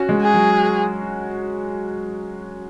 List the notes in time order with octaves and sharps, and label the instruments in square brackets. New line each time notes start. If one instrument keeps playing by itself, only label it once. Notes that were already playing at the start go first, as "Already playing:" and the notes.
Already playing: [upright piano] C#4 F#4
G#3
[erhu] G#4
[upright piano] F#3